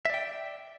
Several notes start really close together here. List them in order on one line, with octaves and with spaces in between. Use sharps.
E5 D5 G5